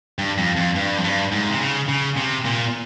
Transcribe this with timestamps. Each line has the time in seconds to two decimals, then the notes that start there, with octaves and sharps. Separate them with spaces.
0.19 G2
0.38 F2
0.57 F2
0.76 G2
0.98 F2
1.04 G2
1.32 G#2
1.50 C3
1.60 C#3
1.89 C#3
2.17 C3
2.45 A#2